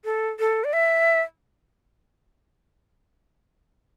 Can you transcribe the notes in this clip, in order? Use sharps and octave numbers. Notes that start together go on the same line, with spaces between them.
A4
A4
D5
E5